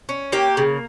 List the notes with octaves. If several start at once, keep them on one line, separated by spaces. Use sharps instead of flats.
C#4
A#3 G4
C#3